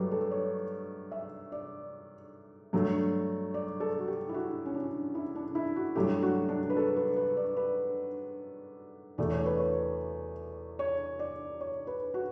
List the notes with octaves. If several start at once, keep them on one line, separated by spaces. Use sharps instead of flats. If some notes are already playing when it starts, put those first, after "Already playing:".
Already playing: G2 F#3 A3 G4 B4
A4
C#5
E5
D5
G2 F#3 A3
D5
A4
F#4
G4
E4
F#4
C#4
D4
E4
D4
E4
F#4
G2 F#3 A3 G4
F#4
D4
B4
A4
B4
B4
D5
B4
E2 B2 A3 D5
C#5
B4
C#5
C#5
D5
C#5
B4
F#4